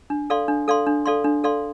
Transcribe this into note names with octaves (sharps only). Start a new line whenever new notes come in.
D4
A4 D5 F5 C6
D4
A4 D5 F5 C6
D4
A4 D5 F5 C6
D4
A4 D5 F5 C6